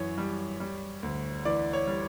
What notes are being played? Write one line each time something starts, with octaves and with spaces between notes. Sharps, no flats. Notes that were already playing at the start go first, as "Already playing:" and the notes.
Already playing: F#2 E3 C#5
G3
G3
D2
E3 D5
C#5
G3